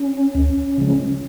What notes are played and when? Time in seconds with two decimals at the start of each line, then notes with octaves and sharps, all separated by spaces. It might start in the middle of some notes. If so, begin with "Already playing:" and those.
Already playing: C#4
0.35 D2
0.78 C#3 F3 G#3